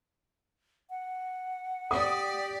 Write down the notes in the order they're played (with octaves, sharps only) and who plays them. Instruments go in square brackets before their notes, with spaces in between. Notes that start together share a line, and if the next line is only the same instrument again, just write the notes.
[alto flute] F#5
[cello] G4 D5 [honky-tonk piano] D#6